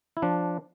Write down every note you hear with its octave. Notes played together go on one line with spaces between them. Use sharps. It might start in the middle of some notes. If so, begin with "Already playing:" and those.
E4
F3 D4